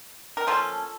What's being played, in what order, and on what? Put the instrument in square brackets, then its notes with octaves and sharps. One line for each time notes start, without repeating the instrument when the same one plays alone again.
[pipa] A#4
F3 A#3 C#4 F4 A4